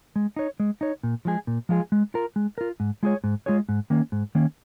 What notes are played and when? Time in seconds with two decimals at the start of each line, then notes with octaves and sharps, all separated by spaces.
0.16 G#3
0.36 D#4 C#5
0.60 G#3
0.81 D#4 C#5
1.03 A#2
1.25 F3 G#3 F4 G#4
1.47 A#2
1.69 F3 G#3 F4 G#4
1.92 G#3
2.14 F4 A#4
2.36 G#3
2.58 F4 A#4
2.80 G#2
3.03 G#3 F4 G#4 C#5
3.24 G#2
3.46 G#3 F4 G#4 C#5
3.69 G#2
3.90 D#3 A#3 C#4
4.12 G#2
4.35 D#3 A#3 C#4